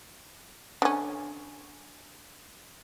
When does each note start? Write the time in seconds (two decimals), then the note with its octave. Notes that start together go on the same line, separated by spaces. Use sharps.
0.82 D3 C#4